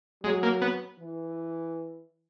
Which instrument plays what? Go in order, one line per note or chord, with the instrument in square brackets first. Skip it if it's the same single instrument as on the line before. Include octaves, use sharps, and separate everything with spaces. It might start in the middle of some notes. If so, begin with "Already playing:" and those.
[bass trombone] F#3 [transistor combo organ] G#3
[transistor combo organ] A#3
B3
[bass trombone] E3